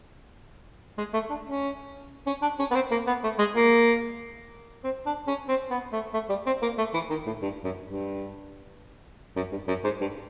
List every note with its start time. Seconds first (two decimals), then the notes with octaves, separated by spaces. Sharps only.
0.98 G#3
1.13 A3
1.30 D4
1.45 C#4
2.27 C#4
2.42 D4
2.59 C#4
2.71 B3
2.75 C4
2.91 A#3
3.07 B3
3.24 A3
3.39 G#3
3.55 A#3
4.84 C4
5.06 D4
5.27 C#4
5.48 C4
5.70 B3
5.93 A3
6.14 A3
6.29 G3
6.46 C4
6.62 A#3
6.78 A3
6.94 E3
7.10 D#3
7.26 A2
7.42 G2
7.64 F#2
7.86 G2
9.36 F#2
9.52 G2
9.68 F#2
9.84 G#2
10.01 G2